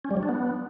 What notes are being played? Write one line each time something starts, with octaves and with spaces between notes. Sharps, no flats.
C#4
G3
F#3
D4
B3